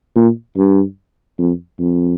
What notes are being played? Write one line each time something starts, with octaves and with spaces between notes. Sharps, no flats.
A#2
G2
F2
F2